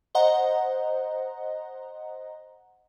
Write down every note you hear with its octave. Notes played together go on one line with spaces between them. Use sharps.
C5 D#5 F#5 A#5